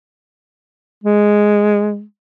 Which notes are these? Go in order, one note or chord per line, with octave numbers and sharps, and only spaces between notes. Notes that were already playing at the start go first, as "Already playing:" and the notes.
G#3